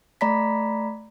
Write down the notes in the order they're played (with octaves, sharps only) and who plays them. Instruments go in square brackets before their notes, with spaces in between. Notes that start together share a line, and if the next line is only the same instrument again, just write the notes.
[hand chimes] A3 D5 A#5 B5 B6